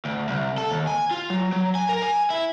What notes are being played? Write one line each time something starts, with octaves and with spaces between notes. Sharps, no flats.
D2
C2
A4
D#2
G#5
F4
F#3
F#3
G#5
A#4
G#5
E4